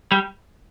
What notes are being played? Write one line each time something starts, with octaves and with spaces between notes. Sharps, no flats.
G3